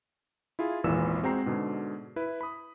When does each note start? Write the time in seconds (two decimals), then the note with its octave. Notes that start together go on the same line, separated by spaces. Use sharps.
0.59 E4 F4 G#4
0.84 G#1 E2 A#2 E3 E6 E7
1.23 G#3 C4 F#4 G5 A#5 C7
1.46 G#2 B2 D3
2.16 E4 B4
2.41 B5 D#6